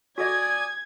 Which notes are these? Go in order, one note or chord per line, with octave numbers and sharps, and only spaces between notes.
F#4 A4 D5 D#5 G#5 D#6 G#6